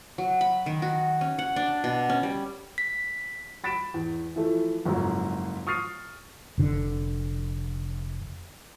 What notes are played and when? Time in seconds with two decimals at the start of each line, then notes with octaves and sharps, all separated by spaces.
0.18 F#3
0.41 B5
0.66 D#3
0.82 F#4
1.21 C#4
1.39 F#5
1.56 D4
1.84 B2
2.10 C#4
2.23 G3
2.78 B6
3.64 B5 A6 B6 D7 E7
3.94 E2
4.36 E3 F3 A3
4.86 F#1 F2 G#2 F#3
5.67 C#6 D#6 F6 A6 C7 D#7
6.58 F1 D3